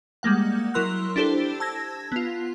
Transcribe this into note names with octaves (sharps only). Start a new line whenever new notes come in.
G3 G#3 A#3 F#5
F#3 E4 A#4 C6 E6 F#6
D4 E4 G4 A4 C5
A5 E6 G#6 A#6
B3 F4